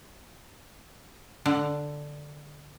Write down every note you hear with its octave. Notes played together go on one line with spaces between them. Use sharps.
D3